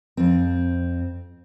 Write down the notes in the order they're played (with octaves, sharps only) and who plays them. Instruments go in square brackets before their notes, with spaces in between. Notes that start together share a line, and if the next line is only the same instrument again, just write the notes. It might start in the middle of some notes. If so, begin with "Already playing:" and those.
[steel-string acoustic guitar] F2 C4